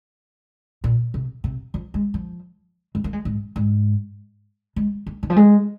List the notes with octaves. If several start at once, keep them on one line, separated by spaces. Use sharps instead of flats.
A#2
C3
C3
F3
G#3
F3
G#3
A#3
G#3
G#2
G#2
G#3
A#3
D#3
F3
G#3